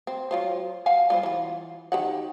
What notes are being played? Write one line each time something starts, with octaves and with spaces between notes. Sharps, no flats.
C4
F#3 F4 C5
F5 F#5 G#5
G3 F4 C5
E3 F4
D#3 G4 F#5